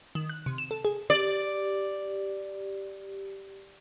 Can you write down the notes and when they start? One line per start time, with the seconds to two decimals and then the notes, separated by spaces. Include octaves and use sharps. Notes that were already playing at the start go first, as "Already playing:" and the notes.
0.15 D#3
0.30 F#6
0.46 C3
0.58 E7
0.71 A4
0.85 G#4
1.10 G4 D5